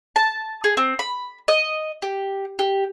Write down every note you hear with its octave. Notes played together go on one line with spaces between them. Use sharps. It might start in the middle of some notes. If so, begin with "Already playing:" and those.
A5
G#4
C4
B5
D#5
G4
G4